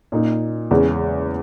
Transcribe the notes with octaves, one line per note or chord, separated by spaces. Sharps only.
A#2 A#3 D#4
E2 C#3 G#3 C#4